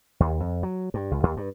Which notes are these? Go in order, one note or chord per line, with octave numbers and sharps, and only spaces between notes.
D#2
F2
F#3
G2
C#2
D#2
G2